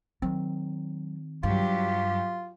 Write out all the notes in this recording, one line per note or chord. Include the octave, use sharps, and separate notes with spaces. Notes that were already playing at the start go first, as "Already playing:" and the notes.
D#3 F#3 C4
G2 F#3 F4 G4